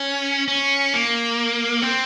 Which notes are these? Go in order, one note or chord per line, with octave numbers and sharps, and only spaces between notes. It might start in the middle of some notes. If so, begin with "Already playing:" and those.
Already playing: C#4
C#4
A#3
C4